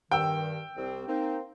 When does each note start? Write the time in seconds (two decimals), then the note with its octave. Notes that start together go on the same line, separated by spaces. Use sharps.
0.11 G2 D#3 G5 E6
0.76 C2 C4
1.07 A#3 C4 D#4